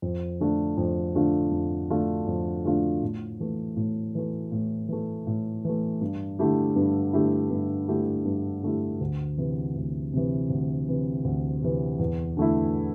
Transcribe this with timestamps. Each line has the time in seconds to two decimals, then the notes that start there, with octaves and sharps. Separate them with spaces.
0.02 F2
0.40 D3 A3 D4 F4
0.78 F2
1.15 D3 A3 D4 F4
1.52 F2
1.90 D3 A3 D4 F4
2.27 F2
2.65 D3 A3 D4 F4
3.02 A2
3.40 E3 A3
3.76 A2
4.15 E3 A3
4.52 A2
4.89 E3 A3
5.27 A2
5.65 E3 A3
6.01 G2
6.39 D3 A3 E4 G4
6.76 G2
7.13 D3 A3 E4 G4
7.51 G2
7.88 D3 A3 E4 G4
8.25 G2
8.63 D3 A3 E4 G4
9.01 D2
9.38 C3 E3
9.75 D2
10.13 C3 E3
10.50 D2
10.88 C3 E3
11.24 D2
11.62 C3 E3
11.99 E2
12.37 D3 A3 E4